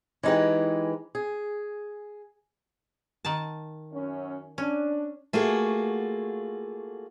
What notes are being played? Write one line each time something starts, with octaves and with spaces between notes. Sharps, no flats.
E3 G#3 D#4 G4 B4
G#4
D#3 A5
F#2 C#4
C#4 D4
A3 A#3 F4 F#4 G#4